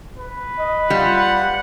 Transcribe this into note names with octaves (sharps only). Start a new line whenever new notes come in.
B4
D#5
G3 F4 F#5